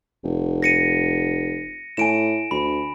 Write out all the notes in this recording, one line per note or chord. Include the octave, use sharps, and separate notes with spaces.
F1
A#6 C#7 D#7
A2 G#5 D7 E7
D2 B5